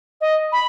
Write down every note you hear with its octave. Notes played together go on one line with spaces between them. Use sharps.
D#5
B5